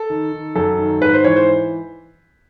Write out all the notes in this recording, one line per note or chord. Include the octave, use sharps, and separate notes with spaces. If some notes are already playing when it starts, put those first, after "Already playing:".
Already playing: A4
D#3
D#3
F#2 A4
D#3
G#2 B4
C5
E3 C#5
C5